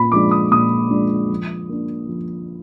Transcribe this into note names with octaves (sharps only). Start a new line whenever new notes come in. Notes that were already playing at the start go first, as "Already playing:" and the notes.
Already playing: A#2 B5
F3 G#3 D4 D6
D#6
A#2 D#6
F3 G#3 D4
F3
A#3 D4
F3